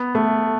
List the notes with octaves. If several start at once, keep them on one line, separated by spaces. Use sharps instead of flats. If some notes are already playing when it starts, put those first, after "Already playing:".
Already playing: B3
A3